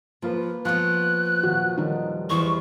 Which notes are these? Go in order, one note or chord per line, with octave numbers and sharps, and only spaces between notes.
F3 A#3 F4 B4
F3 B3 F5 C#6 F#6
D#1 F#4
D#3 G3 D#4
E2 B4 C5 C#6